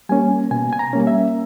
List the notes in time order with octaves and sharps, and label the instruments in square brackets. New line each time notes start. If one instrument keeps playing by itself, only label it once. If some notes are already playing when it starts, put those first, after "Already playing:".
[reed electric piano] G3 A#3 C#4 G#5
B2 G#5
G#5
A#5
G3 A#3 C#4
E5